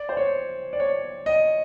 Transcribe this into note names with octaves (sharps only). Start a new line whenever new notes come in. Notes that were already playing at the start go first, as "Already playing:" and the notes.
Already playing: D5
C5
C#5
D5
C#5
D#5